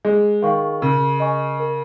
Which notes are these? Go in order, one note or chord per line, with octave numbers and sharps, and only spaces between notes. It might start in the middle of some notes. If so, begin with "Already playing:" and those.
G#3 G#4
D#3 F5 C#6
C#3 A#4
D#5 G#5 C#6
A#4